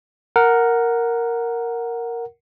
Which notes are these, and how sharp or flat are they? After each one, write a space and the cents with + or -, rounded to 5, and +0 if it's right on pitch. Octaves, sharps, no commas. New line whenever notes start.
A#4 +0 F#5 +0